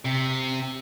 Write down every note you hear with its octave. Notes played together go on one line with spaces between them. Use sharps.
C3